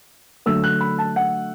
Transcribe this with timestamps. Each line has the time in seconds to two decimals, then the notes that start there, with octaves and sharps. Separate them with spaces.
0.46 D3 F#3 A3 E6
0.64 F#6
0.81 B5
0.98 A5
1.16 F#5